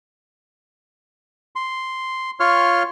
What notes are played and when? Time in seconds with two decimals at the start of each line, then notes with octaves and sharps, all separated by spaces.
1.56 C6
2.40 F4 C#5 C6 C#6 F6